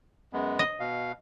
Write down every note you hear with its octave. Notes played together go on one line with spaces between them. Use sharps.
F#2 G#3 B3
D#5
B2 F5